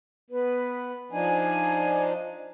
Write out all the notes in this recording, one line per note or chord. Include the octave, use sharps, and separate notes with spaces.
B3 B4
F3 D4 D#4 G#5